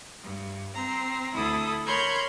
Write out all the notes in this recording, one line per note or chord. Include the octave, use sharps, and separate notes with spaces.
G2
C4 A#5
D2 E4 A4 D#6
A#4 C#5 B5 C6 G6 G#6